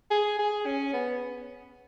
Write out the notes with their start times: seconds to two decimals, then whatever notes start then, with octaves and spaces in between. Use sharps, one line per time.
0.11 G#4
0.39 G#4
0.66 C#4
0.94 B3